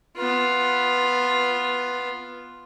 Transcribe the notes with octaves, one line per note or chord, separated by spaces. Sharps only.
B3 F4